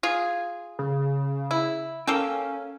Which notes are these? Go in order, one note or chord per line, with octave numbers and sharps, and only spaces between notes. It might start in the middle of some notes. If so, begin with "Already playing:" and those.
F4 G#4
C#3
E4
A#3 C#4 A4 G5